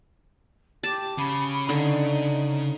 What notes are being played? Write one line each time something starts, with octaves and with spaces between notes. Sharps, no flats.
G4 A5
C#3 B5
D3 D#4